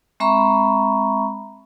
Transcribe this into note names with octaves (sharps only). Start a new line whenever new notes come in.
G#3 C4 E5 A#5 B5 C#6